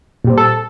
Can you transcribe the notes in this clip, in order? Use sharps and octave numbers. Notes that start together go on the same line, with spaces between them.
A#2 G3 C4
A4